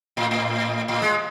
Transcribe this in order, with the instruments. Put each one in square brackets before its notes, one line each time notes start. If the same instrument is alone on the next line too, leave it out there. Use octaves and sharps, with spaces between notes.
[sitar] A2
A2
A2
G#3